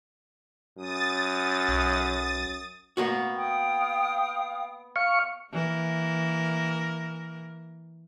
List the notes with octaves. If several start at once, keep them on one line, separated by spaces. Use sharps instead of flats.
F#2 D#6 A6
B1
A#3 B3 F#4
F5 G5 D#6
F5 C#6
E3 A#3 A#4